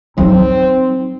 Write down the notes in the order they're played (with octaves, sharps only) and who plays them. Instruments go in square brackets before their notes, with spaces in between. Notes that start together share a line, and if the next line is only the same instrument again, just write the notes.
[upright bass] F#3 D#4 [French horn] C4